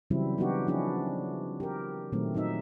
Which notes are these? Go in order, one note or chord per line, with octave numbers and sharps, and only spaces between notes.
C#3 E3 F#3 G3 C4 E4
F#3 B3 D4 D#4 F#4 G4
F3 C#4 D4 E4 F#4 G#4
G4 A#4
A#2 D#3 F#3 A3 C4
F#3 C4 D#4 E5